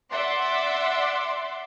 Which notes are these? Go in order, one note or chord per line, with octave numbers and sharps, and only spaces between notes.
D5 E5 F#5 C6 D6